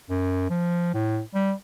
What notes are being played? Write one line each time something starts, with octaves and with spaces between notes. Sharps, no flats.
F#2
F3
A2
G3